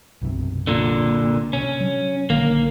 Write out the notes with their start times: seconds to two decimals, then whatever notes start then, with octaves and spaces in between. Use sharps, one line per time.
0.22 B1 F#2 C3
0.67 A#2 D3
1.53 C3 C#4
1.80 F#3
2.30 A#1 D3 D#3 A#3